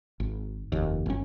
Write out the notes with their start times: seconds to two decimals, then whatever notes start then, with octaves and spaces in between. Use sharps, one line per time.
0.20 G#1
0.72 F1 D#2
1.06 G1 C#4